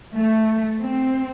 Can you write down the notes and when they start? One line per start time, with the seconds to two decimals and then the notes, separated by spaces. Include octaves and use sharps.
0.17 A3
0.80 C4